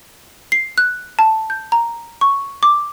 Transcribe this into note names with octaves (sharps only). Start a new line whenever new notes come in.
C7
F#6
A5
G6
A#5
C#6
D6